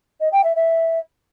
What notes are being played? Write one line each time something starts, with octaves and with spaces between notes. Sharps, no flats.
D#5
G5
E5
E5